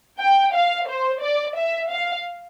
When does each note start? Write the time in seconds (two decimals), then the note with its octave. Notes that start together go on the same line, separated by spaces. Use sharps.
0.20 G5
0.55 F5
0.88 C5
1.22 D5
1.57 E5
1.91 F5